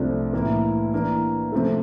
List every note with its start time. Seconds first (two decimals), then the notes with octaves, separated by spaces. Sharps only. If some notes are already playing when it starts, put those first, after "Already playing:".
Already playing: C2 C3 F3 A3 D4
0.33 A2 E3 A#3 E4
0.93 E3 A#3 D4
1.52 C3 F3 A3